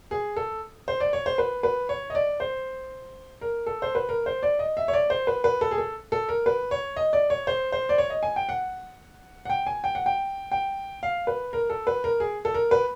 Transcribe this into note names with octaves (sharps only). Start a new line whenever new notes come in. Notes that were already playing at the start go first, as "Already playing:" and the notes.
G#4
A4
C5
D5
C#5
C5
B4
B4
C#5
D#5
D5
C5
A#4
A4
C5
B4
A#4
C5
D5
D#5
E5
C#5
D5
C5
B4
B4
A4
G#4
A4
A4
A#4
B4
C#5
D#5
D5
C#5
C5
C5
D5
C#5
D#5
G#5
G5
F#5
F#5
G5
G#5
G5
F#5
G5
G5
F5
B4
A#4
A4
B4
A#4
G#4
A4
A#4
B4